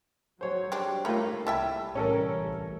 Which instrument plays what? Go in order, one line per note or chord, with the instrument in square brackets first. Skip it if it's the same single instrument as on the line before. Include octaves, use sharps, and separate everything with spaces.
[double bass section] F#3 [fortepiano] C5 C#5
[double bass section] G3 [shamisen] G#3 C4 D4
[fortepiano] A3 A#3 F4 [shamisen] C#5 B5
[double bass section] C2 [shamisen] E4 E5 G5 [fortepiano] A5
[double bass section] C2 A2 E3 [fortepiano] C#4 A4 A#4
[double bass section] A1